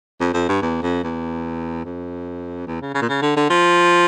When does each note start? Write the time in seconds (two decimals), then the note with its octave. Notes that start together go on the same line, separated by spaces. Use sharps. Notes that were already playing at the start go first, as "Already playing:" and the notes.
0.21 F2
0.34 F2
0.48 G2
0.62 E2
0.82 F2
1.03 E2
1.85 F2
2.67 E2
2.82 C#3
2.94 C#3
3.02 A#2
3.09 C#3
3.22 D3
3.36 D3
3.50 F3